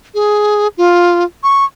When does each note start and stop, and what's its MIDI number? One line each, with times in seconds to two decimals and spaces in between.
0.14 0.68 68
0.77 1.24 65
1.43 1.65 85